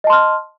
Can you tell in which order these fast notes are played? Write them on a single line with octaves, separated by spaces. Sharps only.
D#5 A5 C6 F6